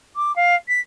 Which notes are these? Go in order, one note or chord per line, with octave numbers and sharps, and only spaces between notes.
D6
F5
B6